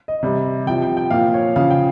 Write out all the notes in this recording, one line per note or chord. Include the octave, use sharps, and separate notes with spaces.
D#5
C3 G3
C3 F3 G5
G5
G5
A#2 F3 F5
C#5
C#3 F3 F5
G5